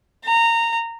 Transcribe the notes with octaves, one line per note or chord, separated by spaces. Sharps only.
A#5